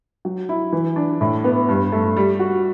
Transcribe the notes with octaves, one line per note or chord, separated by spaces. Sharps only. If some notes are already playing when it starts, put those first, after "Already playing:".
F#3
E4
E3
D4
A2
B3
G2
A3
G3
F#4